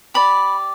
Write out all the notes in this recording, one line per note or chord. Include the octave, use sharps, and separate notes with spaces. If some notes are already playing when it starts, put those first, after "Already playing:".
G4 D5 B5